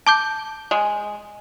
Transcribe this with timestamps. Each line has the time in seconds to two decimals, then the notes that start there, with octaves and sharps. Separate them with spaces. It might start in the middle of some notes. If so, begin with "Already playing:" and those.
0.07 A5 D6 G6
0.71 G#3